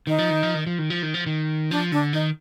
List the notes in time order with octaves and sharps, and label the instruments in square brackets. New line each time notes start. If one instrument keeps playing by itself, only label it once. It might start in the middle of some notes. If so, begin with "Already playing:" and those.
[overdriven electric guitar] D#3 [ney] D#4
[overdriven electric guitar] F3
D#3
F3
D#3
F3
D#3
F3
D#3
F3
D#3
[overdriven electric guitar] F3 [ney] D4
[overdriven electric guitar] D3 [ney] D4
[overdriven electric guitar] D#3 [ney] D#4